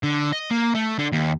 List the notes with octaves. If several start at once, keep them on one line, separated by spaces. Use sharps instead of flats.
D3
D#5
A#3
A3
D3
D#2